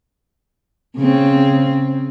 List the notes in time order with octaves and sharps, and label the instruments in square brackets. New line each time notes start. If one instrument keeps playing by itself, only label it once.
[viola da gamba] C#3 C4